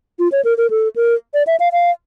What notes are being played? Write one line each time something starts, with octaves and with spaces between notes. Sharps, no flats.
F4
C#5
A#4
A#4
A4
A#4
D5
E5
F5
F5